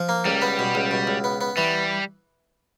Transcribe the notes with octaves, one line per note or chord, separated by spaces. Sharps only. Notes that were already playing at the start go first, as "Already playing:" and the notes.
Already playing: F3
A#3
C#2 G3
B3
B2
C#2
B2
C#2
B3
B3
E3 G3